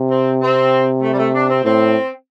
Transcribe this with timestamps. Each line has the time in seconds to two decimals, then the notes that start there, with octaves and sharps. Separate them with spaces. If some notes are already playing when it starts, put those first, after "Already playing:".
Already playing: C3
0.10 C4
0.42 C4
1.02 A3
1.13 G3
1.18 A3
1.34 D4
1.49 C4
1.64 A2 C4